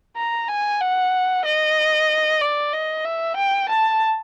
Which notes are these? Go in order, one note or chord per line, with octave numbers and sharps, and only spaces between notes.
A#5
G#5
F#5
D#5
D5
D#5
E5
G5
A5